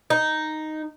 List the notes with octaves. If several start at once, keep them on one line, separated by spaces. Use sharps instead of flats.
D#4